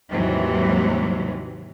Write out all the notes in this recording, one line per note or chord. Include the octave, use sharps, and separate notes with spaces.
D#2 G#2 C3 E3 F#3 G3